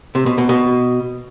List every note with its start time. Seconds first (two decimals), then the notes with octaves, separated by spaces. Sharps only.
0.15 C3
0.26 B2
0.38 B2
0.49 B2